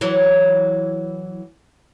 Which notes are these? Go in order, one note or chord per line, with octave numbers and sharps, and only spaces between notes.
E3 F#3